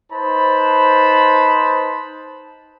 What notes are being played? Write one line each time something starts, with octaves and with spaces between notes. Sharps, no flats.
D#4 B4 C5 A5 B5